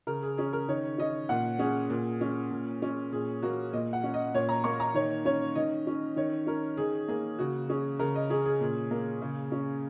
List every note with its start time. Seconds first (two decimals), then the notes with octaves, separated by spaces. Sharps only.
0.07 C#3 A#4
0.23 G#4
0.37 C#4 G#4
0.53 A#4
0.69 D#3 C#5
0.98 C#4 D#5
1.29 A#2 F#5
1.59 C#4 G#4
1.90 A#2
2.21 C#4
2.51 A#2
2.82 C#4
3.12 A#2 G#4
3.42 A#3 F#4
3.73 A#2 D#5
3.93 F#5
4.04 C#4
4.14 D#5
4.34 A#2 C#5
4.49 A#5
4.64 A#3 C#6
4.80 A#5
4.94 D#3 C#5
5.25 C#4 C#5
5.55 D#3 D#5
5.87 C#4
6.16 D#3 C#5
6.47 C#4 A#4
6.77 D#3 G#4
7.08 A#3 G#4
7.39 C#3 F#4
7.69 C#4 G#4
7.99 C#3 A#4
8.15 D#5
8.30 C#4 G#4
8.45 G#4
8.61 A#2
8.91 A#3
9.22 C#3
9.52 C#4